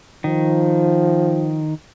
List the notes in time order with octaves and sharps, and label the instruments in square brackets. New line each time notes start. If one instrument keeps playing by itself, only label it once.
[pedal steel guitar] D#3 [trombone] F3